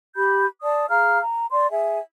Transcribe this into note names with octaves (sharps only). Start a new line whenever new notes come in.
G4 B5 G6
D5 A5 D#6
G#4 F5 A#5 F6
A#5
D5 C6
G#4 E5 G#5